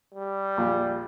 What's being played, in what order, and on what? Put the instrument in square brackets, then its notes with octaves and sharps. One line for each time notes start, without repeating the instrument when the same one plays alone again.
[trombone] G3
[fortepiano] A#1